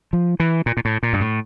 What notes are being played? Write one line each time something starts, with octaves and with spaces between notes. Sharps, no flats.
F3
E3
A#2
A#2
A2
A#2
G2
A2